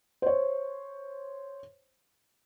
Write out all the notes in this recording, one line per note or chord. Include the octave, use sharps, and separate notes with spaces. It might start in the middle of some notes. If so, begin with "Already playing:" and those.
C5 C#5